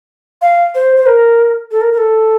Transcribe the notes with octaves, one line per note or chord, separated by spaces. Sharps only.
F5
C5
C5
A#4
A4
A#4
A#4
A4